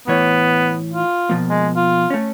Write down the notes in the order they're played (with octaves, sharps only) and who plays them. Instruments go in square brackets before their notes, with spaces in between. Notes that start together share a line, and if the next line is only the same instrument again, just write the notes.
[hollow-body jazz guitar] A2 E3 C#5 [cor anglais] B3
[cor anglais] F4
[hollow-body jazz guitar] B2 F3 A#3
[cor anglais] G#3
F4
[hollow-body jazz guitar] A3 C#4